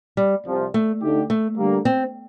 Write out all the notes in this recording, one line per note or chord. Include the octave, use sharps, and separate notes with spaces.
G3
C2 C3 F3
A3
D2 D3 A3 D#4 G4
A3
D3 G3 A#3
C4